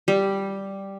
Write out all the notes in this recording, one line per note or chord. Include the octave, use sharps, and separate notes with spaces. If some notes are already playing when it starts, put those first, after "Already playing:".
G3